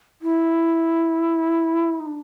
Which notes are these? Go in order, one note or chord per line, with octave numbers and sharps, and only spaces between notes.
E4
D#4
D4